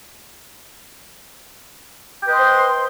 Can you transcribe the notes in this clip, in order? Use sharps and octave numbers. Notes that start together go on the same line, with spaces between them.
B4 C5 D#5 G5 C6